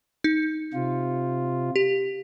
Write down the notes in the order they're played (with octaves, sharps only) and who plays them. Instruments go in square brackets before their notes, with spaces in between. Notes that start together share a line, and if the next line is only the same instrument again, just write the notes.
[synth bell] D#4
[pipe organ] C3 F4
[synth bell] G4